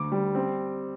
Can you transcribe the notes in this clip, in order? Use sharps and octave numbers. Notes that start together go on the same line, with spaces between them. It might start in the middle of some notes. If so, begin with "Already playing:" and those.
Already playing: D2 D6
G3
C4